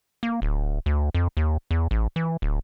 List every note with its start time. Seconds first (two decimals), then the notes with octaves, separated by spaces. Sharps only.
0.23 A#3
0.42 D1
0.86 D2
1.15 F2
1.37 D#2
1.71 E2
1.91 A1
2.16 E3
2.42 D1